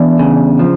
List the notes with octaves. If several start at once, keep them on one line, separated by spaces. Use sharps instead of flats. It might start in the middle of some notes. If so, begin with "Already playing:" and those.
Already playing: E2 D4
C#3
F3